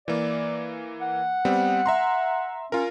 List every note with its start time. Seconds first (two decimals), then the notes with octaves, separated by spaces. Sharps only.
0.08 E3 A#3 D5
1.01 F#5
1.45 G3 B3 C4
1.86 E5 A#5 C6
2.72 C#4 F4 A#4